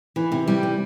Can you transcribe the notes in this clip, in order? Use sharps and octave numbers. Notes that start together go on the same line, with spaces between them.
E3
C3
G3
C3